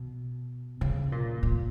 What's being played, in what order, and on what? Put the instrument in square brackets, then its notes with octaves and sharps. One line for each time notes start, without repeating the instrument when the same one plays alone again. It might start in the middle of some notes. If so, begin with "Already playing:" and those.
Already playing: [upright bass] B2
C#3
A#2
A#2